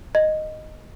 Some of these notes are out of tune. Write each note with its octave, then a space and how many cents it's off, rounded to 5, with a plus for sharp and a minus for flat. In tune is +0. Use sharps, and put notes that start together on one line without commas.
D#5 -5